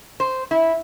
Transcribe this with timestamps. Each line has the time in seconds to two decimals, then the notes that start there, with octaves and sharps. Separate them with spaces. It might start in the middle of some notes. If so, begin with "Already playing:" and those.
0.20 C5
0.51 E4